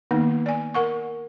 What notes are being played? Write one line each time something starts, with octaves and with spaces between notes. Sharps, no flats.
D#3 A#3 B3 D#4
D5 G#5
A#4 F#5 C#6